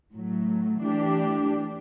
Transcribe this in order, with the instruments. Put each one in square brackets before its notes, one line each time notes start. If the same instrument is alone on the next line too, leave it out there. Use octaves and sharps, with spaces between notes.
[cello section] A2 F#3 A3
E3 A3 D4 G4